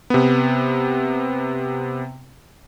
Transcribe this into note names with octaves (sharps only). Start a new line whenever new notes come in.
C3 B3